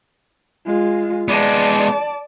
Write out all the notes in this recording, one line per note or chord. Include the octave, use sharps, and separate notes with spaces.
G#3 F4
G#3 B3 D5 A5